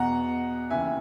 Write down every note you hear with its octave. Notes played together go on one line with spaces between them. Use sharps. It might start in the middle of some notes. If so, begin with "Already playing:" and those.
Already playing: E2 B2 F#5 A#5
D#2 C#3 E3 E5 G#5